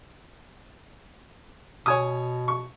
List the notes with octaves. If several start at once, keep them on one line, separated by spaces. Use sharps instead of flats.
B2 C#5 G#5 D#6
C#6